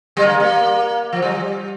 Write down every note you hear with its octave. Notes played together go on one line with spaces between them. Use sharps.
G3
A#3
A#3
F3
G3